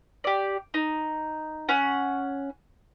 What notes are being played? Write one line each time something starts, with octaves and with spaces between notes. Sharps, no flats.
G4 D5
D#4
C#4 F#5